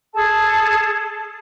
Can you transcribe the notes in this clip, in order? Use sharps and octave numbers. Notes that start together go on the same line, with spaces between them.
G#4 A4 A5